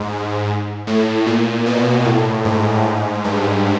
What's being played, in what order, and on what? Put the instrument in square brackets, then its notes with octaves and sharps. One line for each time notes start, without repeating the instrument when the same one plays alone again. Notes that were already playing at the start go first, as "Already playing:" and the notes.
Already playing: [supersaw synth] G#2
A2
A#2
B2
A2
G#2
G2